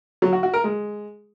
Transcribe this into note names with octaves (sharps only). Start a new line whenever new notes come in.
F#3
F#4
F#4
A#4
G#3